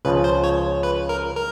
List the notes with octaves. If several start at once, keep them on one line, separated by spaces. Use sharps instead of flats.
C#2 C#3 F3 B4
C5
C#5
B4
A#4
A#4